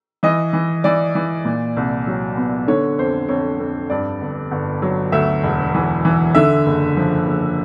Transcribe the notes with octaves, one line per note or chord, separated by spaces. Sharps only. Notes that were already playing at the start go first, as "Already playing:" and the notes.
E3 D#5
E3
E3 D5
E3
A#2
C2
F#3
B3
D3 C#5
F2 C5
F2 C#5
F2
G2 D5
G1
G1
F#3
D2 E5
E1
E3
E3
D3 E5
F#1
F3
F#1